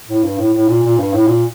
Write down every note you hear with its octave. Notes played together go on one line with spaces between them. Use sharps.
A2
G2
A2
A2
A#2
A#2
G2
A2
A#2